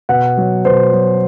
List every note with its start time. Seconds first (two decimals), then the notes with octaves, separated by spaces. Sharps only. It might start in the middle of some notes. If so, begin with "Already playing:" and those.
0.09 B2 F#5
0.37 F#3
0.65 B2 C5
0.93 F#3